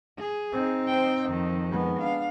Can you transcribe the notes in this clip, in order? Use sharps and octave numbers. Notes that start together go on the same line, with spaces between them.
G#4
C4 D#4
C5 G5
F2 D#3
G#3 B3
D4 F5